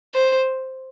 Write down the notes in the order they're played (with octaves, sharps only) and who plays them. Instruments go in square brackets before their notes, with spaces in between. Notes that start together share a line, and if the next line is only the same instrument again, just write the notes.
[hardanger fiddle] C5